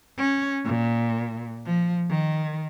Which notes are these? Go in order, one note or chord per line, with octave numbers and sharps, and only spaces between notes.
C#4
A#2
F3
D#3